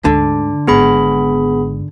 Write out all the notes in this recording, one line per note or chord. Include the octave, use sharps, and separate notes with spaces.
D2 G#2 D3
G#1 G#2 B3 G#4 B5